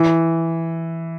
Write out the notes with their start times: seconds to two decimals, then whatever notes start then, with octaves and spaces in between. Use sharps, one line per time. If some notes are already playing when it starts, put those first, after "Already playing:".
Already playing: E3